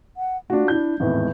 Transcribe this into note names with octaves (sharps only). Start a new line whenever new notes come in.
F#5
A3 D4 F4 F#4
D4 E4 G6
G#1 E2 A2 G#3